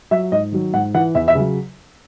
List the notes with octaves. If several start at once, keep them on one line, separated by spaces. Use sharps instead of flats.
F#3 E5
G#2 D#5
D#3 F#3
G#2 F#5
E3 F#5
E2 E5
E5
C#3 F#3